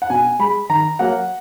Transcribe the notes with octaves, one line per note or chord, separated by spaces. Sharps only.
F#5
B2 G#5
G#3 B5
D#3 A#5
F#3 A#3 F#5